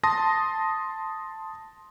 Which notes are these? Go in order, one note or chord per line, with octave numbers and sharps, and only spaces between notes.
A5 C6 D#6 A#6